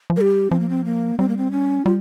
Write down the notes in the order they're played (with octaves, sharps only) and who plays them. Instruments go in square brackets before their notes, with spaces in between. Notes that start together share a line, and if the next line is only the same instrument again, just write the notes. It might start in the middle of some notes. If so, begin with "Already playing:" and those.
[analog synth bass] F3
[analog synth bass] G3 [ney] G4 A#4
[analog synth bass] F3 [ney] C4
[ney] A#3
C4
A#3
[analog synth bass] G3 [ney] C4
[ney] A#3
C4
C#4
[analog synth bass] G3 [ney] F4